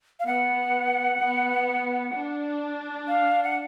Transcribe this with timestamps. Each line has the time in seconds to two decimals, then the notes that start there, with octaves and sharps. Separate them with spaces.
0.20 F5
0.26 B3 F#5
1.20 B3
2.14 D4
3.08 F5
3.44 F#5